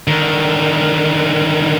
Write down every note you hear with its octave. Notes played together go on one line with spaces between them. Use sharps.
D3 D#3